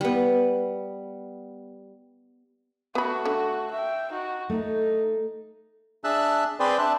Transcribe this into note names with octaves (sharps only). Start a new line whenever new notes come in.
G3 B3
A3 B3 F#4 B5
D3
E5 G5
D#4 F#4
A3 D#4
D4 G#4 E5 A5 E6 F#6
C4 G#4 B4 C5 D5 G5
D4 E5 A5 F#6